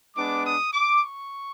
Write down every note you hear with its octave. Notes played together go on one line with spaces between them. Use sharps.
G#3 B3 D4 D6
D#6
D6
C#6